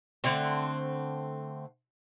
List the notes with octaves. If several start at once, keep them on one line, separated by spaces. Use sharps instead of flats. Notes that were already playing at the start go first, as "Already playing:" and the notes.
D3 A3 C4